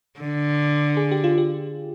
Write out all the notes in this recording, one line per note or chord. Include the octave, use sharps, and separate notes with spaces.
D3
G#4
G4
F4
G4